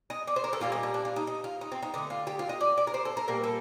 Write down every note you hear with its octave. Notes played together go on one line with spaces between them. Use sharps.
D#5
D5
C5
A#4
A4
A#2 G3 A#3 F4
D#4
D4
D4
F4
D#4
D#4
F4
D#4
C4
D#4
D3 A3 D#4
F4
G4
F4
D#5
D5
D5
A#4
C5
A4
A#4
A#2 G3 A#3 A#4
A4